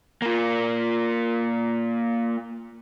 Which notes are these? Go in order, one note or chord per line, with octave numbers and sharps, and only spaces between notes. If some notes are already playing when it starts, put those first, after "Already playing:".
A#3 F4